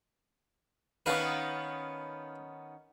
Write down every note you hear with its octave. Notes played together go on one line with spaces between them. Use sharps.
D#3 B3 C#4 B4 F5